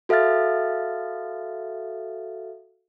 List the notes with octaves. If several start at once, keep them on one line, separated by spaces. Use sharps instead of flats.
F#4 A4 E5 F5 F6 A6